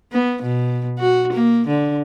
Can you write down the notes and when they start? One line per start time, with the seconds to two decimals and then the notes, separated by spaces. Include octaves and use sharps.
0.12 B3
0.42 B2
0.99 F#4
1.32 A#3
1.67 D3